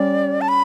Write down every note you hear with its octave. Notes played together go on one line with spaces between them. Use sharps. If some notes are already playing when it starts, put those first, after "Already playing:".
Already playing: G3 C#4 D5
A5
B5